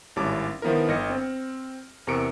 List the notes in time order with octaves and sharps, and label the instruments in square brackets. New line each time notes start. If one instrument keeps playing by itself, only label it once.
[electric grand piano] G#1 A2 G3 C#4 A5 D6
D#3 F3 B3 E4 A#4
G1 D#5 F6 A#6 C#7
C4
E2 C3 A#4 C#6 C#7 D7